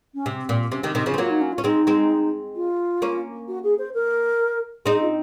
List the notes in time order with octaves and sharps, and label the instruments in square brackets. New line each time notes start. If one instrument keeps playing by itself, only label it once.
[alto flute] C#4
[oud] C3 [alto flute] C4
[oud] A#2
[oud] C3 [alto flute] C#4
[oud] C3 D#3
[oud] C3 D#3 [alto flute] C4
[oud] C#3 F3 [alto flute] C#4
[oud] C4
[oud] F#3 A#3 [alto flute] F4
[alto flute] D#4
C#4
F4
[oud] C#4
[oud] G#3 C4 [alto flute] D#4
[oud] G#3 C4
[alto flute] F4
[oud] A#3 C#4
[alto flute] F#4
G#4
C5
A#4
[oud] C4 D#4 [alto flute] G#4
[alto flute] F4